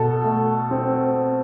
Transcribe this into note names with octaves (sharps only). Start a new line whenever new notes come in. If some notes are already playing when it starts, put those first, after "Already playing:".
Already playing: B2 A4
A3
C4